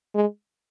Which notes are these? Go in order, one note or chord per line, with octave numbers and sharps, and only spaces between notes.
G#3